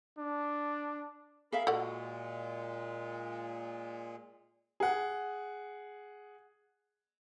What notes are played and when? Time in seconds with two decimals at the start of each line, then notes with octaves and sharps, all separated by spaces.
0.18 D4
1.52 G#4 A#4 E5 F5 B5
1.67 A#2 G#3 F#4 A4 D5 F#5
4.80 G#4 F#5